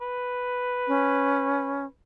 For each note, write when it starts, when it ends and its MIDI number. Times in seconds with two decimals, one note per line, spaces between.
0.01 1.89 71
0.88 1.85 61